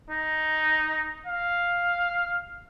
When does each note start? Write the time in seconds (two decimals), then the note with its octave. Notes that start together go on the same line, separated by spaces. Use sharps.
0.10 D#4
1.26 F5